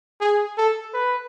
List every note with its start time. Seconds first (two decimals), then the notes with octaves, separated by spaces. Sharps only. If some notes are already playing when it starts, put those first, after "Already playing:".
0.21 G#4
0.58 A4
0.94 B4